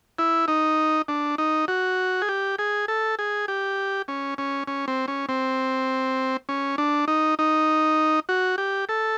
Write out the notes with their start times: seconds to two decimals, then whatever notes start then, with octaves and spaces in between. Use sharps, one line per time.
0.19 E4
0.48 D#4
1.08 D4
1.38 D#4
1.68 F#4
2.22 G#4
2.29 G4
2.59 G#4
2.88 A4
3.19 G#4
3.48 G4
4.08 C#4
4.38 C#4
4.68 C#4
4.88 C4
5.08 C#4
5.29 C4
6.49 C#4
6.78 D4
7.08 D#4
7.39 D#4
8.29 F#4
8.58 G4
8.89 A4